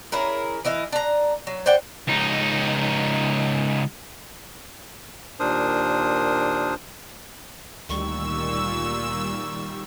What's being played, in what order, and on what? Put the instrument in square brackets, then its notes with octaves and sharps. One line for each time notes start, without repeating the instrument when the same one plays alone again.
[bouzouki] C#4 E4 G#4 A#4
E3 E4 D#5 F5
D4 A#5
F#3
C5 D5 F#5 G5
[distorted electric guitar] C#2 D#4
[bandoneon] D#2 A#2 D4 A#4 C5 D#6
[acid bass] D2 [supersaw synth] A#2 E6 [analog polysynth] D#3 G3 [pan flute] C#6